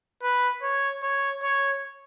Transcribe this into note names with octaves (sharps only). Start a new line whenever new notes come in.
B4
C#5
C#5
C#5